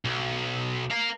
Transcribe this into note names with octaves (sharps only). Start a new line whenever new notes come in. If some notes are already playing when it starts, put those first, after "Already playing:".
B1
A#4 F5